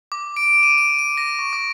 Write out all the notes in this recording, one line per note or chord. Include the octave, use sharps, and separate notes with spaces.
D6
D7
D#7
D#7
D#7
A#6
C#6
D6